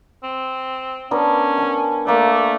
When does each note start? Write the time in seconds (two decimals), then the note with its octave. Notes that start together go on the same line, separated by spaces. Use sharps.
0.23 C4
1.11 B3 C#4 D4 A#4
1.58 G#5 A5
2.07 A3 A#3 D5